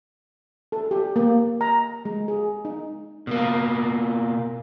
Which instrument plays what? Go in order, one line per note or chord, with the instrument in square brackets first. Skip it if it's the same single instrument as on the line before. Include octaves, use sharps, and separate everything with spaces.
[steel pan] A4
G4
A#3
A#5
G#3
G#4
D#4
[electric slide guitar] B2 A#3